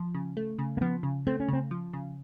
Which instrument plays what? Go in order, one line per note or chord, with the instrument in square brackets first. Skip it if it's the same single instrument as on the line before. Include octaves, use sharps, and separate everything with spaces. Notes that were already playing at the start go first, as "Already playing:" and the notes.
Already playing: [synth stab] F3
C#3
A3
C#3
[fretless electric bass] A#3
[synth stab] F3 [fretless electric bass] B3
[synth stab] C#3
[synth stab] A3 [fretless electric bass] C4
[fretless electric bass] C#4
[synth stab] C#3 [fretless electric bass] C4
[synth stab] F3
C#3